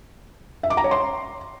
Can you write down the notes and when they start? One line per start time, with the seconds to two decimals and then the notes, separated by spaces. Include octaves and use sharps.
0.63 E5
0.70 D6
0.77 A#5
0.84 C#5
0.91 C6